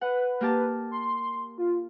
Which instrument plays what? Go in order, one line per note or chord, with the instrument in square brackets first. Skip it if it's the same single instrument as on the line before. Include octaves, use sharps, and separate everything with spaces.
[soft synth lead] B4 [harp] F#5
[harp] A#3 G4 A5
[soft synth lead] C6
F4